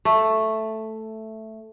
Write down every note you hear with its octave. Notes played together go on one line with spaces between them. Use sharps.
A3